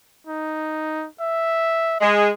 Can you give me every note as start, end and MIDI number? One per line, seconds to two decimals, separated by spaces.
0.27 1.07 63
1.21 1.99 76
2.00 2.29 56
2.00 2.23 75